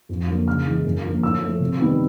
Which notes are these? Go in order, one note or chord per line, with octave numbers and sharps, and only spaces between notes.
F2
D3 F#3 A#3
C#3 F6
E3 G#3
F#2
D3 F3 A#3
A2 E6
F3 A3
C3
D#3 G3 B3